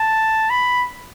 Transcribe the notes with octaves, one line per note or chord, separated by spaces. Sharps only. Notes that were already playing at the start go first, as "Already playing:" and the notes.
Already playing: A5
B5